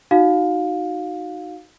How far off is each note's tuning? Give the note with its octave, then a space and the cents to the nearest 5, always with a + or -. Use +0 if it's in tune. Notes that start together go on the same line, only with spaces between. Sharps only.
D#4 +0 F#4 -10 F5 +20